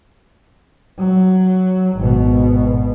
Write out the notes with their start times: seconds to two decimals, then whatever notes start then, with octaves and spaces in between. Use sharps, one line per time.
0.98 F#3
1.97 G#1 B2